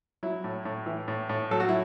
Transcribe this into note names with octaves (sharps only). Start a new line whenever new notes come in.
F#3 E4
A2
A2
E3
A2
A2
F#3 A4
F#4
E4